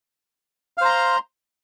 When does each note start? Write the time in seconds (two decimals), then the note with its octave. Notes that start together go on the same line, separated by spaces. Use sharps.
0.78 F5
0.81 C5
0.85 A#5
0.89 C6